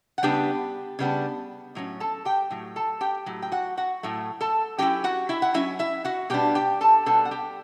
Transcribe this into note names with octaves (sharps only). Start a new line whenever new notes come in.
F#5
C#3 G3 B3 D4 G4 G5
C#3 G3 B3 D4
A2 F#3 C#4
A4 A5
G4 G5
A2 F#3
A4 A5
G4 G5
A2 F#3
G5
F#4 F#5
F#4 F#5
A2 F#3 A3
A4 A5
F#3 C#4 E4 G4 G5
F#4 F#5
E4 E5
F#5
F#3 C#4 E4 E5
E4 E5
F#4 F#5
B2 G3 B3 D4 G4 G5
G4 G5
A4 A5
B2 G3 B3 D4 A4 A5
F#5
G4 G5